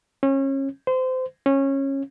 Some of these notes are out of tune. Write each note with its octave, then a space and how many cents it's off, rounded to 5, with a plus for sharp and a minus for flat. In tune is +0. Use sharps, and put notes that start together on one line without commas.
C#4 -30
C5 -25
C#4 -20